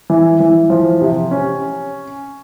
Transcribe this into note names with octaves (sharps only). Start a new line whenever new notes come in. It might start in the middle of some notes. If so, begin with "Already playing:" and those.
E3
E3
F3
C3
C#4